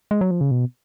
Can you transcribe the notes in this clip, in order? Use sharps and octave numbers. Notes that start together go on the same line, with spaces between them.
G#3
F#3
F3
C#3
B2